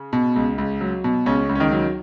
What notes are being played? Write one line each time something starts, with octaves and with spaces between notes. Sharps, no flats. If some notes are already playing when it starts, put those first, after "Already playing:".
Already playing: C#3
B2
C#2
C#2
F#3
B2
C#2 C#3 C#4
C#2
C#4
D#3 D#4
F#3